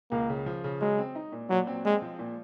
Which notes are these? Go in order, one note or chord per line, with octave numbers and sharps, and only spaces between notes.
C#2 A#3
C#3
F3
C#3
F#3 G#3
C4
D#4
A#2
A#2 F#3
C4
G#3 C4
F3
A#2